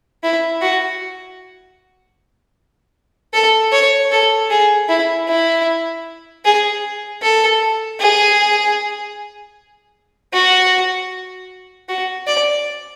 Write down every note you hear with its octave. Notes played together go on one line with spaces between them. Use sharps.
E4
F#4
A4
C#5
A4
G#4
E4
E4
G#4
A4
G#4
F#4
F#4
D5